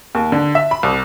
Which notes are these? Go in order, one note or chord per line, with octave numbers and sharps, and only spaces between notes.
D#2
D3
E5
B5
C2